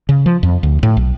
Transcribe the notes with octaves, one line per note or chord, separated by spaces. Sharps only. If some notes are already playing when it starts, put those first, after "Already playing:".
C#3
F3
F2
D2
A2
B1